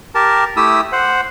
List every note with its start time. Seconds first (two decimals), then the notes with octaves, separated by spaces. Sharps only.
0.15 G4 A#4 A5
0.57 A3 E4 G4 D#6 E6
0.92 C5 F#5